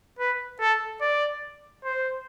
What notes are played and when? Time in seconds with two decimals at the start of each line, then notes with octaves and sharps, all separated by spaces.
0.19 B4
0.61 A4
1.01 D5
1.84 C5